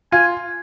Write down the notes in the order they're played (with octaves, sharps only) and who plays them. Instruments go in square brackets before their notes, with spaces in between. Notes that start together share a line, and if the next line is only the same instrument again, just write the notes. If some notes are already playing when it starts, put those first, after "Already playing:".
[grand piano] F4 [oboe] G#5